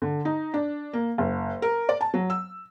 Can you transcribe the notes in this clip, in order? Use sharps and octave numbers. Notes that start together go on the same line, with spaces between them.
D3
D#4
D4
A#3
F#1
A#4
D5
A5
F#3
E6